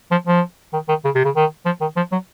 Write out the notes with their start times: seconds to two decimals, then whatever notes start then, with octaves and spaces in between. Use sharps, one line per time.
0.11 F3
0.27 F3
0.73 D#3
0.89 D#3
1.05 C#3
1.15 C3
1.25 C#3
1.35 D#3
1.66 F3
1.81 D#3
1.97 F3
2.12 F#3